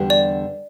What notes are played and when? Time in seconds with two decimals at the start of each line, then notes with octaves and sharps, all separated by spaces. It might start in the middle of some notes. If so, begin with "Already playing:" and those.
Already playing: E2 D3 G3 D4 G4
0.10 D5